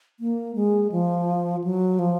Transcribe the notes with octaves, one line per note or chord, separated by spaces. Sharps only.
A#3
G#3
F3
F#3
F3